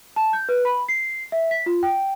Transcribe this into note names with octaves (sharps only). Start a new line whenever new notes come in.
A5
G6
B4
B5
C7
E5
B6
F4
G5